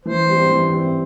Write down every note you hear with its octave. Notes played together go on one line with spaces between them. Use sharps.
E3 C5
G3 C4 G4
E3
G3 C4 G4